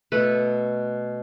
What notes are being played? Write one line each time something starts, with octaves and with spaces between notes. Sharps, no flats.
B2 A3 B4